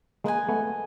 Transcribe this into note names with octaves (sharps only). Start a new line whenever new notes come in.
G#3 A#3 B4 D#5 G#5
A3 B3